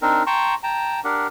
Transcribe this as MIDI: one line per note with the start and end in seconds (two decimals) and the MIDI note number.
0.02 0.23 60
0.02 0.23 62
0.02 0.23 63
0.02 0.23 70
0.26 0.55 79
0.26 0.55 81
0.26 0.55 82
0.26 0.55 84
0.26 0.55 85
0.63 1.00 79
0.63 1.00 81
0.63 1.00 82
1.04 1.27 62
1.04 1.27 67
1.04 1.27 70
1.04 1.27 78